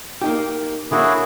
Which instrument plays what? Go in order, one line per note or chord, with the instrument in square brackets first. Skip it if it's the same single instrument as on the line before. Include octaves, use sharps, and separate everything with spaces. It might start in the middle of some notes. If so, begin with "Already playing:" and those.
[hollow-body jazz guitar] A#3 D#4 G4
[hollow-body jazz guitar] D3 A#3 C#4 [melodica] E4 F#4 G#4